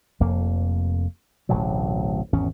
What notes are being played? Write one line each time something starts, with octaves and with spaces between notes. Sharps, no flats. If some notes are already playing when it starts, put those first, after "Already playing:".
F1 F2 A#3
D1 A1 B2 F#3
G#1 E2 C#4